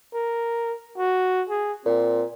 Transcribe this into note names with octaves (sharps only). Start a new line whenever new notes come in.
A#4
F#4
G#4
A#2 C4